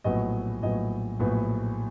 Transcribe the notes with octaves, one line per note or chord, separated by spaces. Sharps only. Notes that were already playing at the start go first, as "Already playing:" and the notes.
A#1 A2 F#3 B3 D#5
A#1 A2 F#3 B3 D#5
A#1 A2 F#3 B3